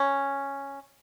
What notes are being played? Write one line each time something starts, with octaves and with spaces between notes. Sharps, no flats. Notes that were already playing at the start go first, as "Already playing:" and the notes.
Already playing: C#4